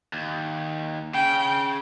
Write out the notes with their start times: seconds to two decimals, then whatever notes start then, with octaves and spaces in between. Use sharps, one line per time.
0.13 D#2
1.14 C#3 G5